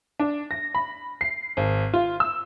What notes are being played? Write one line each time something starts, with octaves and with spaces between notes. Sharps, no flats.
D4
A#6
B5
C7
G#1
F4
E6